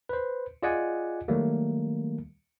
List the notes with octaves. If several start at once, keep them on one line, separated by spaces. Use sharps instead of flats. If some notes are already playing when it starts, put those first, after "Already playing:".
B4 C5
F4 G#4 D5 D#5 F#5 G#5
D#3 F#3 G3 A3 A#3